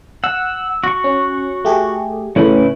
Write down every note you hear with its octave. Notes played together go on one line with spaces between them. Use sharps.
F#5 E6
F#4 C#6
C#4
A3 G4 G#4
A2 C#3 C#4 E4 B4